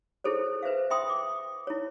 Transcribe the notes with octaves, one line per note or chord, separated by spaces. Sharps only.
E4 G#4 A4 C5 C#5
B4 C5 E5 F5
E5 G5 C6 D#6
D6
E4 C#5